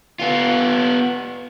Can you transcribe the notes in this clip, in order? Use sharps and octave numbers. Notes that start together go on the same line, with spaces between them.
B3 F4